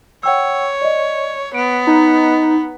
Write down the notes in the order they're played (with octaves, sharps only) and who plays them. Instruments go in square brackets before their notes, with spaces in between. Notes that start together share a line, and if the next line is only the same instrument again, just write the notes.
[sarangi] C#5 [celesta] F#5 G5 E6
[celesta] D5 D#5
[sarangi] B3 [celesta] D7
[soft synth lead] D#4 [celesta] A#5